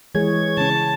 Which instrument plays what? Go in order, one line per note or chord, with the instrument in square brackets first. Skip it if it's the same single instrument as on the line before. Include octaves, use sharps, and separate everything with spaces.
[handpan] E3 G#3 G#4 [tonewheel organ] C#5 G#6
[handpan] C#3 C#4 [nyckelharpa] A5